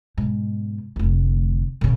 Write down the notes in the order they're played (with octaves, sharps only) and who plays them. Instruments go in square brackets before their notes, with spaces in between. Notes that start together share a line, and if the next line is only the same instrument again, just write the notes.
[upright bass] G#2 B2
F1 D2
A#2 C#3